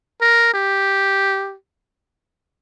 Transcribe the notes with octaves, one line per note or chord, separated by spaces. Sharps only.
A#4
G4